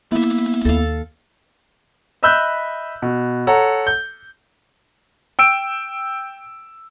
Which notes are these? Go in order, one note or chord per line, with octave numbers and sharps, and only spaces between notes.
A#3 B3 E4 E5
D#2 A4 F5
D#5 E5 B5 E6 F#6 G6
B2
A4 C#5 F#5 A#5
G6
G5 E6 D7